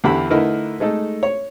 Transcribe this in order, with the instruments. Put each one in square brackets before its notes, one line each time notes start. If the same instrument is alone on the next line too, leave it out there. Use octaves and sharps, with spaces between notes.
[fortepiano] E2 D3 E3 E4 G4 B5
D3 A3 D#4 E4 A#4 B4
G#3 A3 D#4 A4
C#5